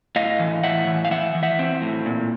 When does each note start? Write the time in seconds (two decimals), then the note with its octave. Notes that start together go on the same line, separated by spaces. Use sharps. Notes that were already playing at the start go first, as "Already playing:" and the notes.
0.16 A2 D#5 F5
0.39 E3
0.63 A2 E5 F#5
0.87 E3
1.05 F5
1.11 E3 E5 F#5
1.35 E3
1.43 E5 F#5
1.59 C4
1.82 A2
2.06 A#2